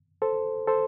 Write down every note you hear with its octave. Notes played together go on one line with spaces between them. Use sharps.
A4 C5
A4 C5